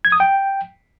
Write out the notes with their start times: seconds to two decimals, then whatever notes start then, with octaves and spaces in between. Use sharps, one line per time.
0.05 G#6
0.12 D#6
0.20 G5